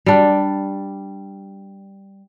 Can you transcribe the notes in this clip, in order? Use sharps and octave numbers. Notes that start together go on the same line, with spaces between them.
G3 D4